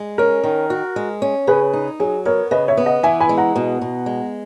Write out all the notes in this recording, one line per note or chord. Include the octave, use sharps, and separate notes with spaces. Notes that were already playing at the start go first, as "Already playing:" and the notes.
Already playing: G#3
C#4 A#4
D#3
F#4
G#3
C#4
C#3 G#4 B4
D#4
F#3 G#4
B3 A#4 C#5
C#3 B4 D#5
C#5 E5
B3
D#5 F#5
E3 E5 G#5
G#5 B5
G#3
F#5 A#5
B2
B2
G#3